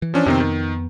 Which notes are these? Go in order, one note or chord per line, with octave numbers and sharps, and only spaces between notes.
E3
F3 C#4 D4
F2 C3 D#3 B3 C4
D#3